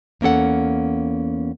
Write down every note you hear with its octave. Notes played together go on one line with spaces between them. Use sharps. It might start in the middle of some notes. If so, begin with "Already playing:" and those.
E2 A#3 C#4 A4 F#5